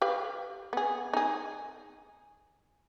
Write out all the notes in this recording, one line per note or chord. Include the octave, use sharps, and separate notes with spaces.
G4 B4 F5
B3 G#4
D#4 G#4